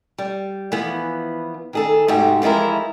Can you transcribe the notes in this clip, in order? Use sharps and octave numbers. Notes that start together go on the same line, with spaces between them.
G3
E3 F3 B3
D#3 G#4 A4
G#2 C3 A3 F#4 G4
E3 F3 G#3 E4 A#4